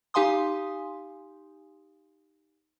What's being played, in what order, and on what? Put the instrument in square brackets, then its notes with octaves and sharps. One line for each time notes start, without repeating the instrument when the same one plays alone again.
[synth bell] D#4 G4 F5 G#5 C6 D#6